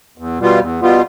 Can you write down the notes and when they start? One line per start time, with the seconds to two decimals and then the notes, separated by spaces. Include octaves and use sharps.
0.18 E2
0.39 B2 G3 B3 F4
0.59 E2
0.81 B2 G3 B3 F4